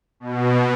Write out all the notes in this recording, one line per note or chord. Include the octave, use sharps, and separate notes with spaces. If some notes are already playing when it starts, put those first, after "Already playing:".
B2